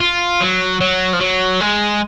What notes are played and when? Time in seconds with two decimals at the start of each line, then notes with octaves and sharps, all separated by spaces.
0.01 F4
0.41 F#3
0.81 F#3
1.13 F3
1.21 F#3
1.61 G#3